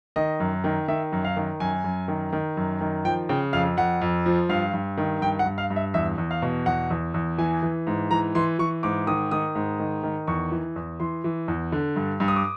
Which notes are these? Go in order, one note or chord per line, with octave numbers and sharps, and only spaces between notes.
D#3 D#5
F#2
D#3
D#3 E5
F#2
F5
D#3
F#2 G#5
F#2
D#3
D#3
F#2
D#3
F3 G5
C#3 G5
F2 F5
F2 F#5
F2
F3
G2 F5
G2
D#3
G2 G5
F#5
G2
F5
G2
E5
E2 E5
E2
F5
B2
E2 F#5
E2
E2
E3 G#5
E3
G#2
E3 A#5
E3 C6
E3 C#6
G#2 D6
D#3 D#6
D#3 D#6
G#2
D#3
D#3
E2 C#6
E3
E2
E3 C6
E3
E2
D3
G2
G2
D#6
D6